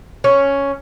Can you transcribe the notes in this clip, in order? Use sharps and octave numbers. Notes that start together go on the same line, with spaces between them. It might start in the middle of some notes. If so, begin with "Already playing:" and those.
C#4